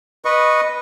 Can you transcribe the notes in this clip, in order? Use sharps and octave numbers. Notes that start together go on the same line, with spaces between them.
B4 D#5 C#6